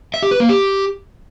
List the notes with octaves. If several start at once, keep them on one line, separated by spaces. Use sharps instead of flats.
E5
G4
B4
A#3
G4